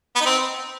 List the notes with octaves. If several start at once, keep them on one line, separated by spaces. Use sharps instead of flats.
B3
D#4
C4